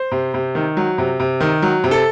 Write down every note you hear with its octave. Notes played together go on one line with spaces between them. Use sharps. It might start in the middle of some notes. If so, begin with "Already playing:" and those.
Already playing: C5
C3
C3
D#3
F#3
C3
C3
D#3
F#3
C3
A4